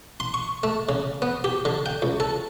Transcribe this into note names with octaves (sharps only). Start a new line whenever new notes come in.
C6
C#6
A3
C#3
B3
G4
D3
G5
C#2
A4